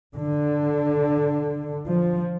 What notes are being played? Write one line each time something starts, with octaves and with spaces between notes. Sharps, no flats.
D3
F3